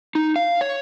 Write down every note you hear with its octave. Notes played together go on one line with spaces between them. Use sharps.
D#4
F5
C#5